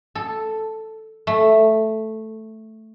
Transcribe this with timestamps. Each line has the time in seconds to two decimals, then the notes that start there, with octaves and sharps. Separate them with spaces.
0.15 A4
1.27 A3